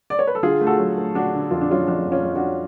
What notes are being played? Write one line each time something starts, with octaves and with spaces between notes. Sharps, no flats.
D5
C#5
B4
A4
D3 F4 G#4
A3
F#4 A4
F#3
A3
D3 D4 F#4
D3
F2 F4
D4
F#3 C#4 F4
F2 D4
F2
C#4 F4
F2
D4 F#4